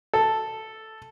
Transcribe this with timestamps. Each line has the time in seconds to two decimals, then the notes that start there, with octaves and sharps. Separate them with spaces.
0.14 A4